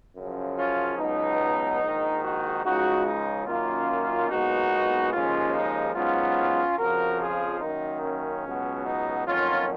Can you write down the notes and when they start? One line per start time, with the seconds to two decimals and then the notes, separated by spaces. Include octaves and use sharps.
0.16 F#2 C#3 F3
0.57 C#4 F4
0.98 C#2 B2 F#3 B3 D#4
1.81 A#1 G#2 D#3
2.22 D#4 F#4
2.64 C#2 C#3 F3 G#3 D#4 F#4
3.05 D#4
3.46 F#2 D#3 A#3 C#4 F4
4.29 B1 A#2 G#3 B3 D#4 F#4
5.12 D#2 C#3 F3 G#3 C#4 F4
5.54 D#4
5.95 G#2 F#3 B3 C#4 F4
6.78 F2 C#3 F3 F#4 A#4
7.20 F4 G#4
7.61 F#2 D#3 A#3 D#4
8.03 C#4
8.44 C#2 B2 F#3
8.85 D#4
9.27 F2 D#3 F#3 A#3 C#4 F4